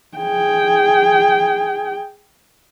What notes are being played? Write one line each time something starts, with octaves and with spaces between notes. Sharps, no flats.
G#4 G5